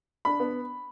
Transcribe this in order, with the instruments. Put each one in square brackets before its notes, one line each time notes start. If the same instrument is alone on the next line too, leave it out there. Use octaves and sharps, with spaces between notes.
[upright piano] D4 B5
B3